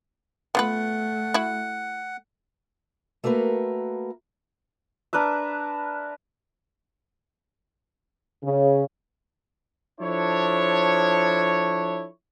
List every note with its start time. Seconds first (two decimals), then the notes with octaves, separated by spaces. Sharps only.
0.55 A3 B3 F4 B4 F#5
1.34 E4 F#4
3.24 A3 A#3 F#4 A#4 B4
5.13 D4 A#4 B4 E5
8.43 C#3
10.00 F3 D4 E4 A4 C#5